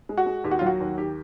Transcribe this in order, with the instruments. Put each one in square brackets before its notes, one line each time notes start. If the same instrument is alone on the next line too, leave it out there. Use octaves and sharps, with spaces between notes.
[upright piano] G#3
F#4
G#3
D#2 G4
F#4
F#3 F4
F#4
D#2
D#3 G4